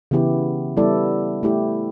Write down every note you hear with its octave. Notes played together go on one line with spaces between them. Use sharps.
C#3 E3 B3 E4 G4
G3 B3 E4 A4 D5
A3 E4 G4